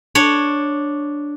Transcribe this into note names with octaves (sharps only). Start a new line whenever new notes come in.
D4 C#5